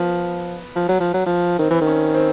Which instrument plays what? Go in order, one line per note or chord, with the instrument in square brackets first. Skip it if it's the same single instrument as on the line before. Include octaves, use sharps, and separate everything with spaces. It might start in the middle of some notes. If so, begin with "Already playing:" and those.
Already playing: [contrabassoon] F3 [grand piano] B3
[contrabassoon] F3
F#3
F3
F#3
F3
[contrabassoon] D#3 [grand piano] C4
[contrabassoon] E3
[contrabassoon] D#3 [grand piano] C#4
[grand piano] C4